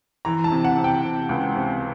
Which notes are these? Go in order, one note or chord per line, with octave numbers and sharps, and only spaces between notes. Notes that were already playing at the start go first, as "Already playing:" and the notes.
E3 A#5
A5
C3
F#5
C3
G5
C3
C#2
C3